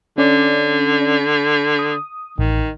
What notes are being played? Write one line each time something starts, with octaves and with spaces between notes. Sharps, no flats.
D3 C#4 D5
D#6
A1 D#3